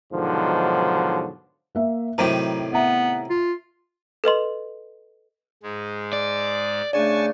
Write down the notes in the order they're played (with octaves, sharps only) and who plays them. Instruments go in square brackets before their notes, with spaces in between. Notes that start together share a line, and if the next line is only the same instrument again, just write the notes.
[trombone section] G#2 B2 D3 D#3 F3 F#3
[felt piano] A#3 E5
[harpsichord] A2 C3 D#3 [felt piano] F#3 G5 A#5
[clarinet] B3 [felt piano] E5 A#5
[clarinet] F4
[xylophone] A4 B4 D#5 C6
[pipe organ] G#2 G#3
[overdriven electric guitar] D5
[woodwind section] C#3 A3 D4 [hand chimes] D5 [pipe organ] G#5 A5 C#6